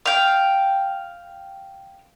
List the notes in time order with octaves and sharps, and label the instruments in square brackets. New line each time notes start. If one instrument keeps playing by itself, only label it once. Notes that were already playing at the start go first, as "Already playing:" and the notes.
[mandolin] F5 G5